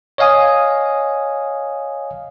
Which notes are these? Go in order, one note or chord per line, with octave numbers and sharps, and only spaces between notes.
C#5 D#5 F5 G#5 D#6